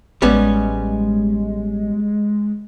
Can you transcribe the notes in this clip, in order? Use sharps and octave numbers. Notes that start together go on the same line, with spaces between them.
A1 G3 G#3 B3 C#4